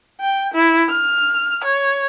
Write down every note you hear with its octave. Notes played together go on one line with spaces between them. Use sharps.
G5
E4
F6
C#5